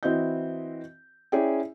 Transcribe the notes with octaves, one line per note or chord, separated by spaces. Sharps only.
E3 C4 E4 F#4 D#5 G6
C#4 E4 G#4 D5 G5